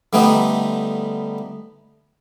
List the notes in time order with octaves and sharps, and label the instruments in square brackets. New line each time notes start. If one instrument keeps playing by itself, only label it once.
[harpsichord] D3 G3 A3 B3 D#4